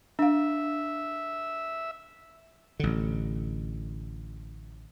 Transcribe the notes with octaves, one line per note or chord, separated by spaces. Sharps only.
D4 E5 F5
A1 D3